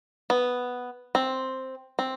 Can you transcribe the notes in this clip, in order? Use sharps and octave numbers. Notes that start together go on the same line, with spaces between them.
B3
C4
C4